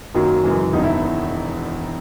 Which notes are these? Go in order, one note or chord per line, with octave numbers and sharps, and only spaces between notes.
F#2 D#3 F#3 A#3
F#1 F#2 E3 G#3
E1 E2 D#3 D#4
E4